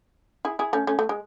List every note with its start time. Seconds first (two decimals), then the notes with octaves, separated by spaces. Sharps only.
0.45 E4 G#4
0.59 E4 G#4
0.73 A3 C#4
0.87 A3 C#4
0.99 A3
1.09 G#3